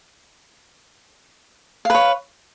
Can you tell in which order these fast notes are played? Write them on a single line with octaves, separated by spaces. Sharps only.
F5 B4 C#5